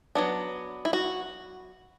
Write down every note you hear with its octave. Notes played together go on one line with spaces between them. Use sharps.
F#3 B3 D4
E4
F#4